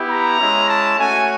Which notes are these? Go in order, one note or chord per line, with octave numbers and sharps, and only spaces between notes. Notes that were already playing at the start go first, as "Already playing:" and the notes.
Already playing: B3 E4 G4
A#5
G#3 C#4 E4
A5
A3 C#4 F#4 G#5